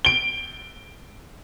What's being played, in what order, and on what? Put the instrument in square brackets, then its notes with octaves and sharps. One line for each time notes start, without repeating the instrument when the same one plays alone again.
[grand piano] D7 G7